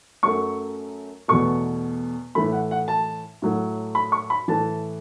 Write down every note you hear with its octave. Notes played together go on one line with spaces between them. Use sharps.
F#2 F#3 A3 C#6
E2 B2 A3 C#6
A2 E3 A3 B5
F#5
F#5
A5
A2 F#3 A3
B5
C#6
B5
A2 E3 A3 A5